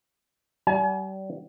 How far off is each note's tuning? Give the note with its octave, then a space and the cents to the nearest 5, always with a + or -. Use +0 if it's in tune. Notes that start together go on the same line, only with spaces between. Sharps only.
G3 -35 G#5 +40